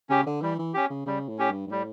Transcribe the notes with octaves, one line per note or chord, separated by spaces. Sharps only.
C#3 C#4 G4
D3
E3 G3
E3
C#4 G4
C#3
C#3 G3
A2
C#4 G4
G2
G2
A2 G3